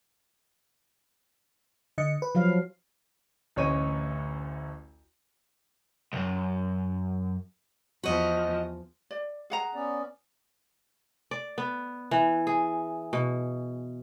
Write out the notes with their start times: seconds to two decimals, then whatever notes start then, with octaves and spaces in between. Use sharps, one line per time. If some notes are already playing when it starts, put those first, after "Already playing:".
1.98 D3 D#5 C#7
2.22 B4
2.35 F3 F#3 F5
3.56 A1 D2 C#4 C#5 D#5 D#7
6.13 B1 F#2
8.04 E2 F3 F#4 D#5
9.11 D5
9.50 G#4 F#5 A#5
9.75 B3 C#4 D5
11.31 D5
11.58 B3
12.11 E3
12.47 G#4
13.13 B2